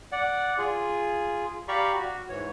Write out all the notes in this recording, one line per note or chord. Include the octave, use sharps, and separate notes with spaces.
D5 F#5
F4 G#4
G4 D5 F5 A#5 B5 C#6
F#4
G#2 E3 C#5